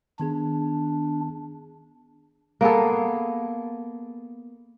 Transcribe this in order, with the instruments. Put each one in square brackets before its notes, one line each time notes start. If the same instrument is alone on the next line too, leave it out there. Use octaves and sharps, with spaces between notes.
[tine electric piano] D#3 B3 G#4 [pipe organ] D4
[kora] A#3 B3 G#4 A4